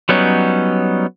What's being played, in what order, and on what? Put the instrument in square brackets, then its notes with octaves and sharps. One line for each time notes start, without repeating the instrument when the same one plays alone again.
[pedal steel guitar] F#3 G3 B3 C#4 D#4